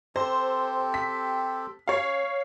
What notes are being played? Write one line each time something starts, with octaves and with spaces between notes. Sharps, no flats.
C4 G4 A4 C5
B6
C#4 C#5 F5